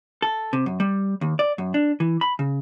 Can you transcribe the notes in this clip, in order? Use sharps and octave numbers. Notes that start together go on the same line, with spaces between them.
A4
C3
F#2
G3
D#2
D5
F#2
D4
E3
B5
C#3